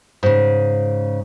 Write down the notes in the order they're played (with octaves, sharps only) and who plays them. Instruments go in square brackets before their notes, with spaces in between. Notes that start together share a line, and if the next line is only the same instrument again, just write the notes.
[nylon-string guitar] G#2 C#3